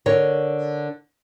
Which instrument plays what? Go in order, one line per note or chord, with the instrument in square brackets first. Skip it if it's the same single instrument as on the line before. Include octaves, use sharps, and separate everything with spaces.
[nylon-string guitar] D3 A#4 C#5